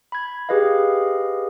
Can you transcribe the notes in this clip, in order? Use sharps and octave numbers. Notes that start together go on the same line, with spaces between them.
B5 G#6
G4 G#4 B4 D#5 F5